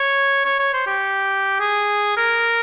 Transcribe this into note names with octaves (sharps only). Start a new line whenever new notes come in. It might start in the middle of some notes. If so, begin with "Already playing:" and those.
Already playing: C#5
C#5
C#5
C5
G4
G#4
A#4